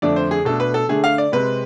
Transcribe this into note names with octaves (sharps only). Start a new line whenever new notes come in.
F2 D3 A3 D4 D5
C5
G#4
B2 A3 D4 A4
B4
A4
D3 A3 D4 G#4
F5
D5
C3 G#3 C4 B4